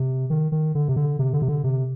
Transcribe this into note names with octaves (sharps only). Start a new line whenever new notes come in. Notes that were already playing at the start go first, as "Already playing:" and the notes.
Already playing: C3
D#3
D#3
D3
C3
D3
C3
D3
C3
D3
C3